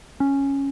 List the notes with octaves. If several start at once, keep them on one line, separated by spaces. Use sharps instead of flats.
C#4